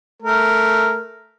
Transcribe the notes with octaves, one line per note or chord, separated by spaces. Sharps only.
A3 A#4